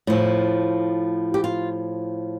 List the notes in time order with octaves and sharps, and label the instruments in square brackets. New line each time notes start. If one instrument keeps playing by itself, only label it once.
[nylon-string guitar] A2 F3
G4
F4